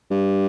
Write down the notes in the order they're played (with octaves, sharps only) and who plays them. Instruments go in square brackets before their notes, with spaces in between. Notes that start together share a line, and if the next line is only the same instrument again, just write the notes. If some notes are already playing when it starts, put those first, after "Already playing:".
[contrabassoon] G2